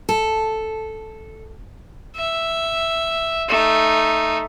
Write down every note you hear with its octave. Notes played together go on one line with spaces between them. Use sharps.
A4
E5
A3 D#4